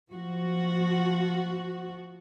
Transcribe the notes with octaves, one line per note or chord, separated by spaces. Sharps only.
F3 F#4